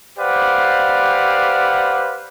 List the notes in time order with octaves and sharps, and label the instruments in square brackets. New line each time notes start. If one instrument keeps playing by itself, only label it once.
[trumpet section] G4 B4 C5 D5 F5 F#5